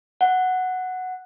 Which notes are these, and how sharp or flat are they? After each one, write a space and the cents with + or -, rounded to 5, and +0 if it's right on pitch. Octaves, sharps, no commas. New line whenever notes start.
F#5 +0